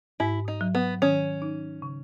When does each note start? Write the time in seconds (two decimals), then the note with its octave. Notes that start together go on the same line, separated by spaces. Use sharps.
0.20 G#2 E4
0.48 D#4
0.61 F#3
0.75 B3
1.02 D#3 C#4
1.42 D#4
1.82 C#3